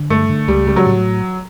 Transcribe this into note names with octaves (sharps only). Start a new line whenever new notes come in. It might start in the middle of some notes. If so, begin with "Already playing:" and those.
Already playing: D3
G2 A3
D3
C#2 G3
C#3 G3
F#3
A2